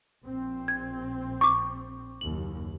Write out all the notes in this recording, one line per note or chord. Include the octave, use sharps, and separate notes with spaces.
A#1 C4
G#6
C#6 D6
F#1 D#2 F#7